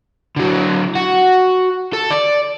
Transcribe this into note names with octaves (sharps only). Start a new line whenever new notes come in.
D3 F#3
F#4
A4
D5